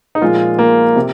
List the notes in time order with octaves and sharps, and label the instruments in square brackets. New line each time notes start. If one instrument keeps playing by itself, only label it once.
[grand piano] D#4
A#2 F3 G#3 F4
A#3
C3